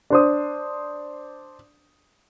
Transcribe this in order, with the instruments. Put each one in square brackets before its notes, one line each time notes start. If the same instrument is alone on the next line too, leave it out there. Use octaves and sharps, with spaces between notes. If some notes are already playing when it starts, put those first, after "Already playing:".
[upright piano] D4 C5 D#6